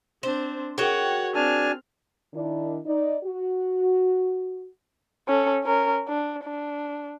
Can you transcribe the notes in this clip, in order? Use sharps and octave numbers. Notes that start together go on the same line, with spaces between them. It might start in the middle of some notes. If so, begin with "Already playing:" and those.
C4 D4 C5
F#4 G#4 A#4 C#5 F#5 G5
C4 D4 G#5 A5 F6
D#3 D4 E4
D#4 D5
F#4
C#4 A4
C#4 A#4
D4
D4